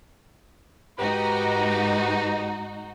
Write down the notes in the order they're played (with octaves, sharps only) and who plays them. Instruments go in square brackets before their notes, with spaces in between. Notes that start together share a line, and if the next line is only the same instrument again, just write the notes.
[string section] G#2 D#4 F#4 [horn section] G4 B4 A#5